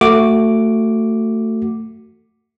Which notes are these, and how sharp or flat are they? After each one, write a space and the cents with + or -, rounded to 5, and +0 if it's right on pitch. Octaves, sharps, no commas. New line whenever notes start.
A3 +20 F#4 +0 D6 +0